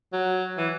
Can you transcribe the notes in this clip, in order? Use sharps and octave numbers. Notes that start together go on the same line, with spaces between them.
F#3
E3